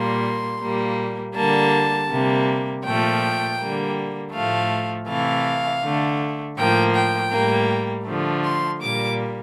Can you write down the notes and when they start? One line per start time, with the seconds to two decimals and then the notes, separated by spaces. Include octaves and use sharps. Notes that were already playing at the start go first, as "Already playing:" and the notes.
Already playing: A#2 G3 A#3 C6
0.60 A#2 G3 A#3
1.35 D3 G3 A#3 A5
2.10 C3 G3 A#3
2.84 A#2 F3 A3 G5
3.59 D3 G3 A#3
4.33 A2 F3 A3 F5
5.08 C3 E3 A3 F5
5.83 D3 A3
6.56 A2 F3 A#3 G5
6.95 G5
7.32 A2 G3 A#3
8.06 D3 F3 A3
8.43 C6
8.81 A#2 G3 A#3 D6